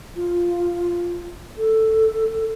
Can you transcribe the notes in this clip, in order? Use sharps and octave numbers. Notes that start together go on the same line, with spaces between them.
F4
A4